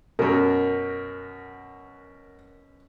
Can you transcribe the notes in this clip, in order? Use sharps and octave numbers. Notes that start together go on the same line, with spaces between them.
F#2 B2 A#4